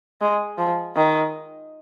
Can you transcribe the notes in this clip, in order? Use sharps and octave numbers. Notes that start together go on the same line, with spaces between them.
G#3
F3
D#3